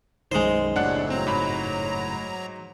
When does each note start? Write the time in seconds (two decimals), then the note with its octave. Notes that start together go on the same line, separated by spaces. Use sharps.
0.32 B1 F#2 D#3 G#3 C5
0.76 F#1 D#2 A2 F#3 A3 D4 F#5 F#6
1.10 F#3 C4 A#5
1.27 G#2 B5